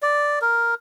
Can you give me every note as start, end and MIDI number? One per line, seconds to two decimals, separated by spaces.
0.02 0.39 74
0.41 0.74 70